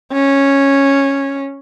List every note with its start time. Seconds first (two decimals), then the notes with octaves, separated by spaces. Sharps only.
0.13 C#4